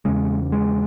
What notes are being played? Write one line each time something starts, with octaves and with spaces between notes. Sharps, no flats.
E2 C#3 G#3
G#3